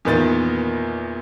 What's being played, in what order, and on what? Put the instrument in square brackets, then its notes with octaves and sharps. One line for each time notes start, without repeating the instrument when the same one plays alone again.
[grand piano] E2 A#2 D#3 B3 A6